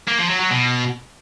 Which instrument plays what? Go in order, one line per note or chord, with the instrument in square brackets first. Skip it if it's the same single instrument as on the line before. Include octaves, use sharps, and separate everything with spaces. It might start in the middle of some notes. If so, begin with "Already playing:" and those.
[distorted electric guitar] A#3
F3
F#3
F#3
B2